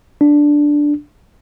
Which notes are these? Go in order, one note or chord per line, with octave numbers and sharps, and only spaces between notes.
D4